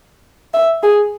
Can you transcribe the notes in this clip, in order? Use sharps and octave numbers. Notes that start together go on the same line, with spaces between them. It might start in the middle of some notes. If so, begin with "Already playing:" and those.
E5
G#4